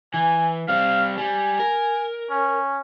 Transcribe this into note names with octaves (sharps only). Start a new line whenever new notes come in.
E3 G#5
G3 C4 F5
G3 G#5
A#4
C#4